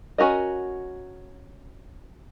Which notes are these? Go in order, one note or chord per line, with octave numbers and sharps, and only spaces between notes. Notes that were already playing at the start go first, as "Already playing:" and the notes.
C#4 F#4 A#4 D#5